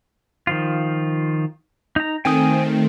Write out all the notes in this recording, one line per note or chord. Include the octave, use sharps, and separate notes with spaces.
D#3 F3 F4
D#4 A#5
D#3 A3 C4 G5 G#5 D#6